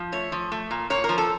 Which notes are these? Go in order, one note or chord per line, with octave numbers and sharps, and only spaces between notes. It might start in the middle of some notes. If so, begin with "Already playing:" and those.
Already playing: F3
A3 C#5
F3
A3
A#2
A#2 C#5
A#4
F3
A4